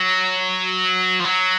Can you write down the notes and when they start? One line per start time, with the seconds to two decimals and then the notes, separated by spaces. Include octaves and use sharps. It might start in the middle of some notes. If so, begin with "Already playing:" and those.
Already playing: F#3
1.20 F3
1.25 F#3